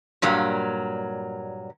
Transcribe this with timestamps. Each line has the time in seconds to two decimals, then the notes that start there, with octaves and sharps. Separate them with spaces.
0.22 G2 A#2 F#3 G3 A#3